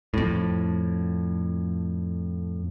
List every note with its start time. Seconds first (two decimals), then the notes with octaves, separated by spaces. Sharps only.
0.14 F2 A2